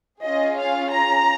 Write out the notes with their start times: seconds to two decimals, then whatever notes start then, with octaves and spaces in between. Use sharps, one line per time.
0.24 C#4 F4 G#4 D#5
0.58 F5
0.92 A#5